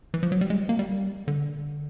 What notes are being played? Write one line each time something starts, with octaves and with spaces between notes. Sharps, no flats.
E3
F3
F#3
G3
G#3
A#3
G3
D3